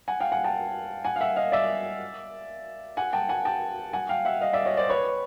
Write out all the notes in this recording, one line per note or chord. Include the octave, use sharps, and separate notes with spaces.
F#5 G#5
F5 G5
F#5 G#5
G5 A5
F#5 G#5
F5
E5 F#5
D#5 F5
D5 E5
F#5 G#5
G5 A5
F#5 G#5
G5 A5
F#5 G#5
F5 G5
E5 F#5
D#5 F5
D5 E5
C#5 D#5
C5 D5
B4 C#5